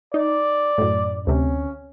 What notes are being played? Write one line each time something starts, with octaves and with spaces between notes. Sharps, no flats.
D#4 D5
F#2 A2
D2 C3 C#4